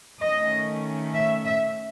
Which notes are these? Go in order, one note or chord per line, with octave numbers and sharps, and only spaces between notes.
D#3 A3 C#4 D#5
E5
E5